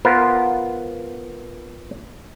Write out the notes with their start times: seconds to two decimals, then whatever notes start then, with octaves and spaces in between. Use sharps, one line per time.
0.05 B3 F4 A#4 C5